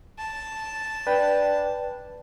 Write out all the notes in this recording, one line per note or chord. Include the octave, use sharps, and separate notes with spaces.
A5
D4 B4 G5